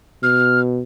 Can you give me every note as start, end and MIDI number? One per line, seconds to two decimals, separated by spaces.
0.23 0.82 47
0.23 0.60 89